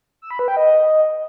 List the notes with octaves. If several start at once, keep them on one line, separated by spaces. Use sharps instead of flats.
E6
B5
B4
G5
D#5